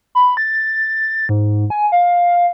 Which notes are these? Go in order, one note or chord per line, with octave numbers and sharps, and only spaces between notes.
B5
A6
G#2
G#5
F5